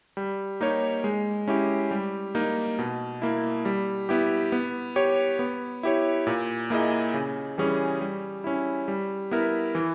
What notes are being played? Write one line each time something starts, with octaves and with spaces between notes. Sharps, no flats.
G3
A#3 D#4 G4 C#5
G#3
C#4 E4 G4
G3
A#3 D#4
B2
A#3 E4
G3
B3 E4 G4
B3
G4 C#5
B3
E4 G4 C#5
A#2
A#3 E4 G#4 D#5
C#3
E3 G3 C#4 G#4
G3
C#4 E4
G3
B3 E4 A#4
E3